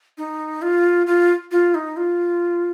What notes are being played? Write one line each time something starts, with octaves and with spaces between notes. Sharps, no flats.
D#4
F4
F4
F4
D#4
F4